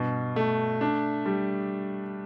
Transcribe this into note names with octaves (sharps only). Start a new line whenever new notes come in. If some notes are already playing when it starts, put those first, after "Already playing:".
Already playing: G2 B2
A3
D4
G3